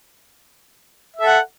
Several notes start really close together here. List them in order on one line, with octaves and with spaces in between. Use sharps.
E5 A4 F#5